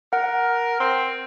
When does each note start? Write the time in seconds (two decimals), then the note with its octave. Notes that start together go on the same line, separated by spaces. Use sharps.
0.13 A#4 F#5
0.80 C4